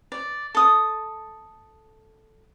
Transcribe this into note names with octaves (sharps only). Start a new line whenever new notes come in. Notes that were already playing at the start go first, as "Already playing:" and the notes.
D5
A4 D#6